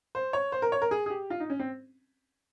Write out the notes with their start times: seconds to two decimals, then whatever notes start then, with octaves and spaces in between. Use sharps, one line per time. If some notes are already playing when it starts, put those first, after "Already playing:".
0.15 C5
0.33 C#5
0.52 C5
0.62 A#4
0.72 C#5
0.82 A#4
0.91 G#4
1.06 G#4
1.10 G4
1.30 F4
1.40 D#4
1.50 C#4
1.60 C4